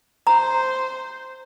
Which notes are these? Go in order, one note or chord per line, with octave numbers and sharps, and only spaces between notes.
C5 A#5